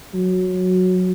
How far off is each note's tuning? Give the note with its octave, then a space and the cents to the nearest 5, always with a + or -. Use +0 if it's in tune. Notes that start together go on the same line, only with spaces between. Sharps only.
F#3 -10